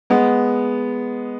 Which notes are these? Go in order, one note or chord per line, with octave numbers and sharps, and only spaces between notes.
G#3 B3